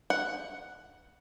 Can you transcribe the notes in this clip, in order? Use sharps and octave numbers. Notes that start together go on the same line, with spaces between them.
F#5